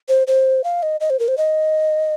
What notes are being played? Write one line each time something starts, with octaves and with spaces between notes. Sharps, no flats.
C5
C5
F5
D#5
D#5
C5
A#4
C5
D#5